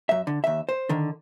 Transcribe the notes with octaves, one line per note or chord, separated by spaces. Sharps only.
F#2 E5
D3
D#2 E5
C5
D3 D#3